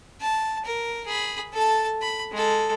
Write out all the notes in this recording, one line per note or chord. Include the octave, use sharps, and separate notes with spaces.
A5
A#4
G#4 B5
A4 A5
B5
G#3 A4